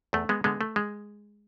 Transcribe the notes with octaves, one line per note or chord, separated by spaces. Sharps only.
E2 A3
G#3 B3
D3 G#3 B3
A3
G#3